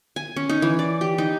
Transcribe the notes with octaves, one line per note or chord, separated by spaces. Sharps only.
G#5
C#4
D#4
E3
D5
G4
D#4